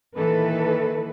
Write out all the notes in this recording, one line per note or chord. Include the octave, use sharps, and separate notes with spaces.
A#2 D#3 E3 A4 B4